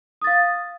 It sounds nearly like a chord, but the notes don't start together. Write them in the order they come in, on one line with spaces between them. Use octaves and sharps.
D#6 A6 F5